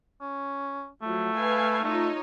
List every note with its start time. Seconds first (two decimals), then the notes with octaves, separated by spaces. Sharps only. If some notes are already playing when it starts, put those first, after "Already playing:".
0.21 C#4
1.02 F3 F#3 A3
1.35 B4 F5 G#5
1.84 A3 D#4 F4 C#5